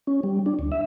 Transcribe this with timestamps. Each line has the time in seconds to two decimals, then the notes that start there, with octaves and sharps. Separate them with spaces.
0.07 C#4
0.23 G3
0.46 D4
0.59 D2
0.72 E5